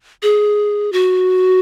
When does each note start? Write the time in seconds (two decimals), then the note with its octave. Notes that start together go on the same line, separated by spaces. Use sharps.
0.23 G#4
0.92 F#4